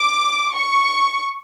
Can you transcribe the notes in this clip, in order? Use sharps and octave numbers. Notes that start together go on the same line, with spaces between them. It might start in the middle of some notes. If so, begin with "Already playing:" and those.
Already playing: D6
C#6